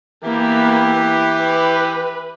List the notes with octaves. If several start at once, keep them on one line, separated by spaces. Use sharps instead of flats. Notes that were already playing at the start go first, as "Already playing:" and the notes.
E3 A#3 B3 G4
B4